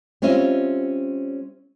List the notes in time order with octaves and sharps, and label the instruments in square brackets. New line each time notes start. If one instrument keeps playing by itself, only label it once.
[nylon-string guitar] G3 C4 C#4 F4 D#5 E5